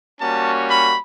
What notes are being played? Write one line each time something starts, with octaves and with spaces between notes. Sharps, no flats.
G3 A#3 C#4 F#4 A5
B5